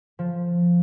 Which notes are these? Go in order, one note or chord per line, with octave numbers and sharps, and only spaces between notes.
F3